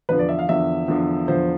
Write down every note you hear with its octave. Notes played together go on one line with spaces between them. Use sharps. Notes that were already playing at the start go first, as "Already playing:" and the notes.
E2 D3 F3 B4
D5
E5
F5
E2 D3 F3 E5
E2 D3 F3
E2 D3 F3 C5